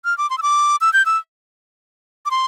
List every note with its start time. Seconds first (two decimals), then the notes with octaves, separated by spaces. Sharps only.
0.05 F6
0.18 D6
0.30 C6
0.38 E6
0.42 D6
0.81 E6
0.93 G6
1.06 E6
2.26 D6
2.31 C6